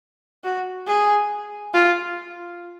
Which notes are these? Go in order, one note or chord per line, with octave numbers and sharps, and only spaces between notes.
F#4
G#4
F4